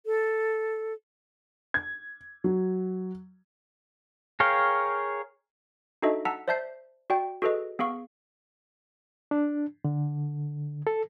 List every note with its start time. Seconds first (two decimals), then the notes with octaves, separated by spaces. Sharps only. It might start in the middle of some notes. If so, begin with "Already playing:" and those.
0.06 A4
1.74 G#6
2.44 F#3
4.40 G#4 A#4 C#5 F5 G5
6.02 D4 D#4 F#4 A4 D#5 E5
6.25 F#5 A5 A#5 E6 B6
6.48 C5 D5 E5 A5 G6 C7
7.10 F#4 D5 G5
7.42 F#4 G#4 A4 B4 D#5
7.79 B3 G#4 F5 C#6
9.31 D4
9.84 D3
10.87 A4